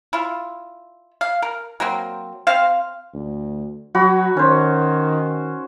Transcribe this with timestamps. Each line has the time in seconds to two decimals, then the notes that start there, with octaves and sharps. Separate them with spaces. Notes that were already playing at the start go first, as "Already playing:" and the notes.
0.13 E4 F4
1.21 F5
1.42 A#4
1.80 F#3 A#3 C4
2.47 C4 C5 F5
3.14 D2
3.95 F#3 F#4 B5
4.37 D#3 C#4 C5